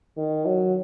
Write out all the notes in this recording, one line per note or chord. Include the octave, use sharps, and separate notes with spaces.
D#3
F#3